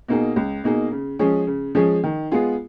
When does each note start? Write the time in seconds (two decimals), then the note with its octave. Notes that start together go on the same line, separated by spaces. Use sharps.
0.08 B2 A#3 D#4 G#4
0.36 C#2
0.64 B2 A#3 D#4 G#4
0.91 C#3
1.19 F3 G#3 C#4 G#4
1.47 C#3
1.75 F3 G#3 C#4 G#4
2.04 D#3
2.32 G#3 B3 F4 G#4